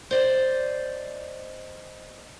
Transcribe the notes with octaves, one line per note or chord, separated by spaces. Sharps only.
C5 D5 D#5